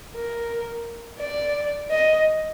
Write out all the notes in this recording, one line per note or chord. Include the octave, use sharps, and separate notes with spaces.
A#4
D5
D#5